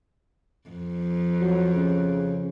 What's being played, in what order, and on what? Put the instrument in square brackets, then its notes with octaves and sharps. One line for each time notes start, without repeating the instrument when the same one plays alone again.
[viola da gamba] F2
[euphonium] F#3
C#3